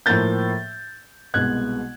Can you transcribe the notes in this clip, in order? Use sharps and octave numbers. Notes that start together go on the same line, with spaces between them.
A2 F3 A#3 G6 A6
C2 B2 G#3 B3 F#6 G#6